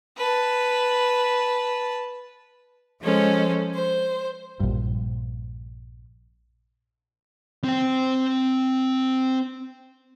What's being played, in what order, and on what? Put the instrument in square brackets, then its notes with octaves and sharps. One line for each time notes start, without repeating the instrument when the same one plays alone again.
[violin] B4 A5
[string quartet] F3 G#3 C#4 A4 C5
C5
[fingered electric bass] A#1 G2
[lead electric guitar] C4 G5